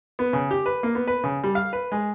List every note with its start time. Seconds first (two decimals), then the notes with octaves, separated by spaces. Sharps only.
0.19 B3
0.33 C#3
0.51 G4
0.66 B4
0.83 A#3
0.95 B3
1.08 B4
1.24 C#3
1.44 G3
1.55 F5
1.73 B4
1.92 G#3